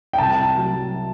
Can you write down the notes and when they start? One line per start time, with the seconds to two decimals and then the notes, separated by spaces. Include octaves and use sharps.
0.13 G5
0.18 C2 A5
0.57 F#3